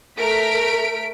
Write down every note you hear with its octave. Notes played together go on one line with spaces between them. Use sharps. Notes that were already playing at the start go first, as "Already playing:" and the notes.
A3 A#4 B6 D7